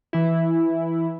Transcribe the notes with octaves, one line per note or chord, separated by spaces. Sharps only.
E3 E4